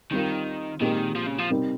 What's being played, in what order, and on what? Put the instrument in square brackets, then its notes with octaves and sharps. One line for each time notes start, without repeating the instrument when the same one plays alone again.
[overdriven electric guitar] D#3 [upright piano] G3 C4 F4 A#4
[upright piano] A#2 G#3 C4 G4 A#4 [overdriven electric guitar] D#3
[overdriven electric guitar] F3
C#3
F3
[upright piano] C3 G3 C4 D#4 A#4